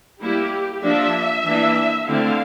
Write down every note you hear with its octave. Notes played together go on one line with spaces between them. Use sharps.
G3 A#3 E4 G4
F3 A#3 D4 E5
E3 A#3 D4
D3 A3 C4 E4 F5